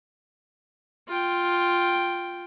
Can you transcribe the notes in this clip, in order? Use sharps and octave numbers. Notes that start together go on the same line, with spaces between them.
F4 G5